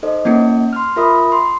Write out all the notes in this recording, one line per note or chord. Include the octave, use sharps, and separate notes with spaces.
D#4 A4 C5 D#5
A#3 C#4 E4 C#7
C6 F6
F4 A#4 E5 B5 D#6
C6